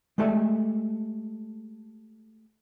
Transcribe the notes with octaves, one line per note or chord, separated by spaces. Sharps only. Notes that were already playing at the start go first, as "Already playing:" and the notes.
G#3 A3 G4 A4 D5 E5